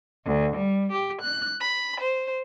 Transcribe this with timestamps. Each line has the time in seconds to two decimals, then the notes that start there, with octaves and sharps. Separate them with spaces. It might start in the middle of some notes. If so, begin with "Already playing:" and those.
0.24 D2
0.55 G3
0.91 G4
1.21 F#6
1.60 B5
2.00 C5